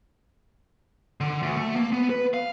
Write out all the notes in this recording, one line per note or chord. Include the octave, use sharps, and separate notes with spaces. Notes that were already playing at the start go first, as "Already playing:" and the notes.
D3
D2
A3
A#3
B3
B4
F5